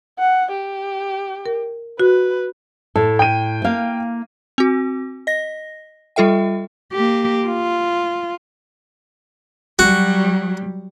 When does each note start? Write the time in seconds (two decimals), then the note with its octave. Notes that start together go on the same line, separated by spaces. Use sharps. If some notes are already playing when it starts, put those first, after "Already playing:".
0.19 F#5
0.51 G4
1.46 A#4
1.99 F#4 B4
2.96 A2 A4
3.19 G5 D#7
3.64 A#3 F5
4.58 C4 F#4
5.27 D#5 A#6
6.16 G3 F4 A4 E5 G5
6.93 A#3 G4
7.47 F4
9.79 F#3 G3 F#4